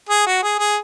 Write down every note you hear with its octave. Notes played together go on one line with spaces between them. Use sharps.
G#4
F#4
G#4
G#4